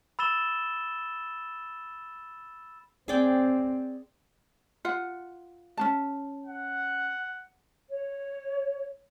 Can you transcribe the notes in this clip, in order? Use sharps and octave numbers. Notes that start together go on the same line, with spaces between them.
B5 E6 A6 E7 G7
C4 G#4 D5 G5
F4 F#5
C#4 D4 A5
F#5
C#5